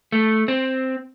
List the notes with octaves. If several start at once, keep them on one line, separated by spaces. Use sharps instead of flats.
A3
C4